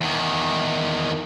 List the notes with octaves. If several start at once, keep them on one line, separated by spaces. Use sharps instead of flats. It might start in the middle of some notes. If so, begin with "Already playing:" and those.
E2 D#3